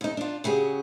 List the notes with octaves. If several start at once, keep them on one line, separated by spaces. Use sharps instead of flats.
D#2 D#4
D4 F4
C#3 F#3 G4 G#4